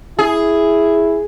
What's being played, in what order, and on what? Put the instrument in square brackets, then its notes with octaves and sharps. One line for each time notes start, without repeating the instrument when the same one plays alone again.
[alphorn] E4 [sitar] G#4